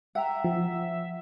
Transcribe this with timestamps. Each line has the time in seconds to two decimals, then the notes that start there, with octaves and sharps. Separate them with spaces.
0.15 E5 F#5 G5 A#5
0.44 F3